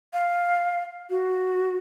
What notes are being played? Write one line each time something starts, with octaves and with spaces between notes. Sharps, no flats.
F5
F#4